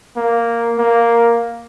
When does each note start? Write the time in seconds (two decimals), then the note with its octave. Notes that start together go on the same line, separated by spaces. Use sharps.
0.16 A#3
0.78 A#3